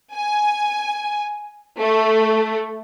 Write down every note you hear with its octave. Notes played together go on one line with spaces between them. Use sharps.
G#5
A3